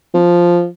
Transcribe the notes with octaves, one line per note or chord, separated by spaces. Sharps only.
F3